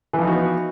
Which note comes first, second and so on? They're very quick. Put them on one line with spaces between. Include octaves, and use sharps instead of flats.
E3 F3 D#4 F#4 B3